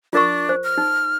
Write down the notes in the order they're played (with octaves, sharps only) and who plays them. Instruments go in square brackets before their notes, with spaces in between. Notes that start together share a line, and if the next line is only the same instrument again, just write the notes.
[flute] D4 [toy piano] F4 A#4 C#6
[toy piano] C5
[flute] F6
[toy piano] D#4